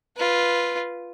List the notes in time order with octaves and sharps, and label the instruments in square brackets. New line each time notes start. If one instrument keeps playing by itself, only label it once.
[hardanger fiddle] F4 B4